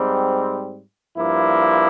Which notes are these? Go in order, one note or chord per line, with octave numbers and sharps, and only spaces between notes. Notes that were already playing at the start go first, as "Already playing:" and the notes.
Already playing: G#2 G3 C4
G2 F3 A#3 E4